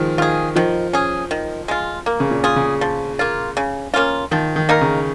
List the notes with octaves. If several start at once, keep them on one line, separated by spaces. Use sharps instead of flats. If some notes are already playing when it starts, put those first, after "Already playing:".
Already playing: D#3 F3 G#3
D#3 F4 G#4
D#3 F3
C#4 G#4
D#3
G#3 F4
A#3
C#3
A#2
F4 G#4
C#3
F3
A#3 F4
C#3
A#3 C#4 F4
D#3 F3
D#3
A#3 D#4 A#4
C#3